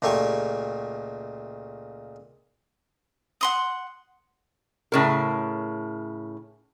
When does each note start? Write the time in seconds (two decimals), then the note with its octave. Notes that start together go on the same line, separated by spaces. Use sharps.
0.02 C#2 A#2 A3 G4 G#5 C#6
3.41 F#5 C6 D#6
4.92 A2 C#3 A#4